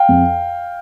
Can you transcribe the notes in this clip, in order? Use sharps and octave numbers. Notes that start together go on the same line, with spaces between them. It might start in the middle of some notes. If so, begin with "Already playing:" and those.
Already playing: F5 G5
F2